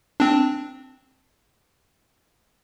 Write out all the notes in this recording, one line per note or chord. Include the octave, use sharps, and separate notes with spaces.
C4 D4